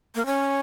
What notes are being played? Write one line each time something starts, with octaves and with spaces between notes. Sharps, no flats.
A#3
C#4